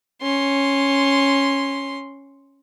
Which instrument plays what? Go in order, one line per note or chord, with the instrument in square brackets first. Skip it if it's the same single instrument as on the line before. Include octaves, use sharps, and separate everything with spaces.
[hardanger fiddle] C#4 C6